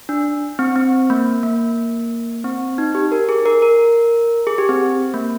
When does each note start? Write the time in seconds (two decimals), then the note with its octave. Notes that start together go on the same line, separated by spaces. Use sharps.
0.09 D4
0.59 C4
0.76 C4
1.10 A#3
1.43 A#3
2.44 C4
2.78 D#4
2.95 G4
3.12 A#4
3.29 G#4
3.46 A#4
3.62 A#4
4.47 G#4
4.58 G4
4.69 C4
5.14 A#3